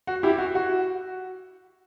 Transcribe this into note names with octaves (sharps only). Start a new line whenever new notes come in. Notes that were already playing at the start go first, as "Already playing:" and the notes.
F#4
E4 G4
F#4
F#4